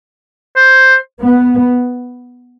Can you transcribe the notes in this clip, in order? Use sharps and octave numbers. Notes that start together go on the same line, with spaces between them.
C5
B3